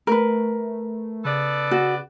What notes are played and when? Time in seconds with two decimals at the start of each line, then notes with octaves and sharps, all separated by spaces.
0.07 A3 A#4 B4
1.25 C#3 B3 A4 D5
1.71 F#4